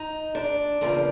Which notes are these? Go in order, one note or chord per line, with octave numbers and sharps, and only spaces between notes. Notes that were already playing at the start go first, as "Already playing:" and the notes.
Already playing: D#4
D4
E2 C#3 F3 A#3